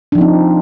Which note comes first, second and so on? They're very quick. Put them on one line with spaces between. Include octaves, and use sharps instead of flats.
D4 F3 D#4 C4